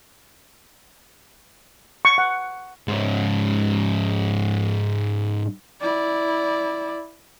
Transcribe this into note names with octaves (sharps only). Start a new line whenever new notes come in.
C#6
F#5
G#2 C#4
E4 D5